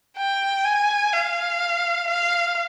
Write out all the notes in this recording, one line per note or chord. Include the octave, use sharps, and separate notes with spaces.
G5
G#5
F5
F5